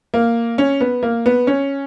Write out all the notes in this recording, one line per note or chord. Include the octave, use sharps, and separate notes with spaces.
A#3
C#4
B3
A#3
B3
C#4